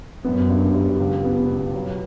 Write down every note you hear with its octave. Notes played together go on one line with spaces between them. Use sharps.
F#2 B3
G2
G3
C#2
B3
B2
F#3